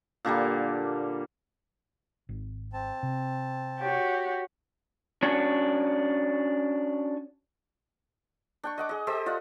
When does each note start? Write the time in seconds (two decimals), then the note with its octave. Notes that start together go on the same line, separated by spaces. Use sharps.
0.25 A#2 D3 G3 A#3
2.29 G#1
2.73 C4 A5
3.03 C3
3.80 F#4 G4 C#5
5.23 C#4 D4 F#4 C#5
8.63 D4 G5 C#6
8.78 D#5 F#5 D6
8.89 G#4 D#5
9.07 G4 A4 C5 D#5
9.26 F4 D5 F#5